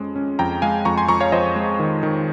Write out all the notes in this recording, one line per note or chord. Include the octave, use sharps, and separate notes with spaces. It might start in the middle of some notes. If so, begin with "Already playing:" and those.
Already playing: F2 G#3 C#4
C#4
F2 G5 A#5
G#3 F5 G#5
F2 A#5 C#6
G#5 C6
F2 A#5 C#6
C#5 F5
F2 C5 D#5
G#3
D#3
D#3